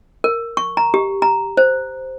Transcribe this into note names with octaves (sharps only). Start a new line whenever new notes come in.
A#4
C#6
A#5
G4
A#5
C5